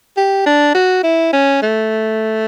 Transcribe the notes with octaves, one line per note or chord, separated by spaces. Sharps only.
G4
D4
F#4
E4
C#4
A3